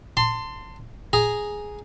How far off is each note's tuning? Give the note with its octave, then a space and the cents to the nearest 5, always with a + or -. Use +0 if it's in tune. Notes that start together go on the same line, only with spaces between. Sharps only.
A5 +30 C6 -10
G#4 +0 A#5 +0